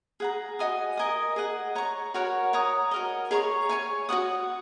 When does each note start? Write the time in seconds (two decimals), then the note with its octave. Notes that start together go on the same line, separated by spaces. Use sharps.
0.20 G#4 F#5 A#5
0.59 F#4 D#5 G#5 D#6
0.97 A#4 D#5 G#5 D#6
1.36 G#4 D#5 F#5
1.75 C#5 A#5 C#6
2.14 F#4 A#4 C#5 F#5
2.53 C#5 A#5 D#6
2.91 F#4 A#4 D#5
3.31 G#4 C#5 A#5 C#6
3.69 C#5 G#5 C#6
4.09 F#4 C#5 F#5 D#6